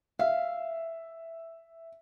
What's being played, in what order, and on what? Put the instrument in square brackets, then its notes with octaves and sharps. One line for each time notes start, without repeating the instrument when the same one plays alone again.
[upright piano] E5 [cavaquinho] F5